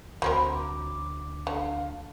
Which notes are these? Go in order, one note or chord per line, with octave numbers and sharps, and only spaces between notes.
D2 F#3 C4 A#4 B5
D6
D3 F5